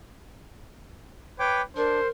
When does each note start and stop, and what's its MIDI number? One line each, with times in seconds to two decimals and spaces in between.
1.39 1.63 71
1.39 1.62 73
1.39 1.62 79
1.39 1.62 86
1.76 1.99 62
1.76 2.08 70
1.76 2.08 72